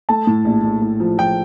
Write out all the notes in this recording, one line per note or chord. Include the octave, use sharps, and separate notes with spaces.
A3 A5
A2
A#1
A#1
A2
F3
F3 G5